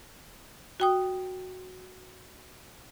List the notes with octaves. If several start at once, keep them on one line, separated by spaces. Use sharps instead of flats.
F#4 G5 D#6